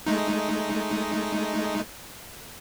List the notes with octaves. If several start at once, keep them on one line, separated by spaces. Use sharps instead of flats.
G#3 A3 D#4